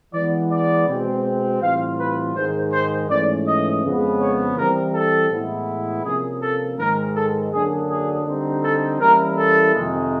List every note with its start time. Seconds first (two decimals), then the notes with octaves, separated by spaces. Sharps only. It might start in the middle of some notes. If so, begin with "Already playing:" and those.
0.14 E3 G#3 B3 D5
0.51 D5
0.88 B2 G#3 C4
1.61 A2 E3 G3 C4 F4 F5
1.99 B4
2.35 G#2 D#3 G#3 C5
2.73 C5
3.09 G#2 E3 A3 C#4 D5
3.46 D#5
3.83 F2 C#3 F3 G#3 B3
4.20 C#5
4.57 E3 G3 C4 E4 A#4
4.94 A4
5.31 A2 E3 G#3 B3 E4
6.05 C3 F3 A#3 C#4 G#4
6.41 A4
6.79 G#2 D#3 G#3 A#4
7.16 A4
7.52 F#2 D3 F#3 A#3 D4 G#4
7.89 G#4
8.26 D3 G3 C4 D#4
8.63 A4
9.00 E3 G3 A#3 C#4 E4 A#4
9.37 A4
9.74 F2 C3 D#3 G#3